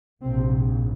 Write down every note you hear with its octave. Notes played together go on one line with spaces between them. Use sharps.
A#1 G#2 C3 C4